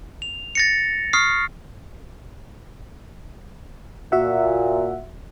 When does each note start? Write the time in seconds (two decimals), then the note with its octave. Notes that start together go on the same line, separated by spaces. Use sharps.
0.22 F7
0.55 A6 A#6 C#7
1.13 C#6 D#6 F6 C7
4.12 A#2 F#4 E5 F#5